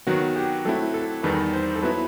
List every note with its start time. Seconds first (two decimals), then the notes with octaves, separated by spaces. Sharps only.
0.07 D#3 F#3 B3 F#4
0.36 G4
0.65 F#3 A3 C4 E4 A4
0.94 A4
1.23 E2 D#3 G3 D#4 A4 B4
1.53 C5
1.76 A4
1.82 F#3 B3 E4 B4